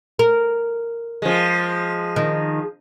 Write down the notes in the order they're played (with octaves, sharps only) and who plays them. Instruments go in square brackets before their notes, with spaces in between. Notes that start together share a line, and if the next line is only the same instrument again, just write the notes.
[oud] A#4
[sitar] F3 G#3
[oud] D#3